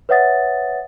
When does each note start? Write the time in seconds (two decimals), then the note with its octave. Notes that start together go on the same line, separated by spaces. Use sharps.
0.09 B4 C#5 E5 F#5 D#6 A6